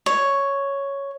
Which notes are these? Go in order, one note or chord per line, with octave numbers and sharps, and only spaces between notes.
C#5